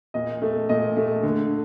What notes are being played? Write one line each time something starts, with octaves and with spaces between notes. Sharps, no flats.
A#2 D#5
A3
A#2 D#5
A3
D3